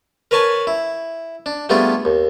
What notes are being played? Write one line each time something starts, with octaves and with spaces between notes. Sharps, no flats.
A#4 B4 C#5 G#5 A5 B5
E4
D4
G3 A3 B3 D4 F4 G#4
D#2